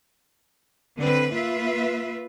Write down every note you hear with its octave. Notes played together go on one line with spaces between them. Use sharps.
D3 C4 B4
A#3 F4 B4 E5